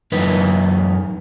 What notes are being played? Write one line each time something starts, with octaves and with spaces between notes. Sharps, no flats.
F#2 E3 D#4 B4